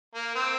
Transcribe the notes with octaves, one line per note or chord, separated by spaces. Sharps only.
A#3
C4